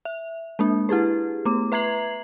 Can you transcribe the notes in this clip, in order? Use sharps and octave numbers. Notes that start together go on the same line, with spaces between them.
E5
G#3 A#3 D4
E4 G4 G#4 B4
A3 B3 D6
B4 E5 A#5 G#6 C7 F#7